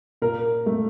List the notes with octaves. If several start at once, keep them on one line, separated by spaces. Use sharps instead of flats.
A#2 A#4
A3